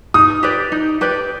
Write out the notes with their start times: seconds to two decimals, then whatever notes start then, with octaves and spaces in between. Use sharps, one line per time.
0.14 D#4 D#6
0.43 G4 B4 D5
0.72 D#4
1.01 G4 B4 D5